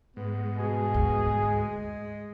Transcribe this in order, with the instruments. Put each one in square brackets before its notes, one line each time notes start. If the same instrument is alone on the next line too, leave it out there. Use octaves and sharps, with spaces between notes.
[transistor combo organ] G#2 [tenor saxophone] B3
[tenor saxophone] B2 [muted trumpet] G#4
[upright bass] D2
[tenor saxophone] G#3